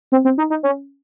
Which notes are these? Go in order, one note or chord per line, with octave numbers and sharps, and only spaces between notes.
C4
C4
D#4
D#4
C#4